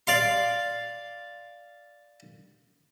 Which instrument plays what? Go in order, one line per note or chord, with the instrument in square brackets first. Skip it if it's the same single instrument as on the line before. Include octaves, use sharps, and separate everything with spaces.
[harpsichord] D5 F5 C6